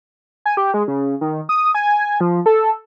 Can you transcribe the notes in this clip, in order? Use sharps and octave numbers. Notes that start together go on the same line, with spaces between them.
G#5
G4
G#3
C#3
D#3
D#6
G#5
F3
A4